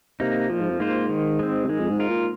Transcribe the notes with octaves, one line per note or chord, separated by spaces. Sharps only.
C3 A#3 D#4
A#2 F3
G#2
F2
G#2 A#3 F4 C5
D#3
G#3 C4
C3
D#3 G#3
F2
G#2
F4 A#4
A#2